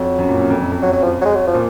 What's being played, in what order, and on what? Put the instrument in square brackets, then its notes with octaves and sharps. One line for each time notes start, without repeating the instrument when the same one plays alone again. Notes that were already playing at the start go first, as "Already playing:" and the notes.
Already playing: [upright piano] F2 [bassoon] F#3
[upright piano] F#2
A#2
F#2
F2
F#2
F2
[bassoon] F#3
F#3
F3
F#3
G#3
F#3
F3
[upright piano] A#2